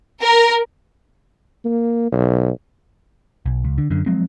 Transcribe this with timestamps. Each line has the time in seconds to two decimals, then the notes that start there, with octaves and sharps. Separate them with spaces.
0.22 A#4
1.65 A#3
2.12 B1
3.46 B1
3.65 C#2
3.78 D3
3.90 F#2 D3
4.06 F3 F#3 G#3 C4